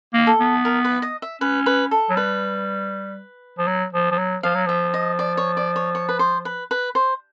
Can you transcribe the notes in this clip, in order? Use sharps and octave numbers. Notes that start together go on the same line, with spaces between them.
A#3
A4
B3
A#4
B4
D#5
E5
C#4 B4
B4
A4
F#3
G3 B4
F3
F#3
F3
F3
F#3
F3 F5
F#3
F3 E5
D#5
D5
C#5
D5
C#5
C#5
B4
C5
B4
B4
C5